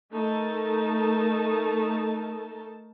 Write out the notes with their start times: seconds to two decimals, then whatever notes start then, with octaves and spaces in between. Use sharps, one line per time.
0.13 A3 D#4 A4 A#4 A5